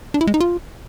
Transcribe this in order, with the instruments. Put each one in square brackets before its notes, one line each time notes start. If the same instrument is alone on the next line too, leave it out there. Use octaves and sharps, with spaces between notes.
[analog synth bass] D4
E4
G#3
D#4
F4